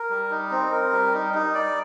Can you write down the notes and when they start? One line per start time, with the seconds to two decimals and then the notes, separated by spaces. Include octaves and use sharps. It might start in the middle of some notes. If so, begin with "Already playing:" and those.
Already playing: A#4
0.10 G3
0.30 D#4
0.51 C4
0.71 A#4
0.92 G3
1.13 D#4
1.34 D#4
1.55 D5